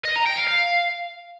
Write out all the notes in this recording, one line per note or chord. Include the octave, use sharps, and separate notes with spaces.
D#5
A#5
G5
F5
F5